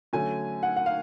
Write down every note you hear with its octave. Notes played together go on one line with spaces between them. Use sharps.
D3 F#3 A3 C#4 G#5
F#5
F#5
F5